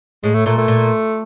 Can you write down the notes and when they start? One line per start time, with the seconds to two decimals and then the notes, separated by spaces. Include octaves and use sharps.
0.24 A2 G#3
0.34 A3
0.46 A#2 A3
0.58 A3
0.68 A#2